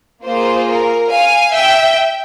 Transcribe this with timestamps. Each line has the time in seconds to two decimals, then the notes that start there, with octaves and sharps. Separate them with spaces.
0.24 A#3 F4 G#4 C5
0.68 A#4
1.11 F5 G#5
1.53 E5 G5